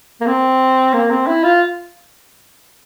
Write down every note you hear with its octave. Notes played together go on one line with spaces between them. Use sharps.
A#3
C4
A#3
C4
E4
F4